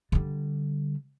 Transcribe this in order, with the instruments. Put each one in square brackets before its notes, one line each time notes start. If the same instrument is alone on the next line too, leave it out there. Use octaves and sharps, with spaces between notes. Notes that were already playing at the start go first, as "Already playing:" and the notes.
[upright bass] D3 G3